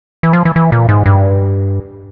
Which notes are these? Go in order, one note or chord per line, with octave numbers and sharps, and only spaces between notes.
E3
F3
E3
E3
A#2
G#2
G2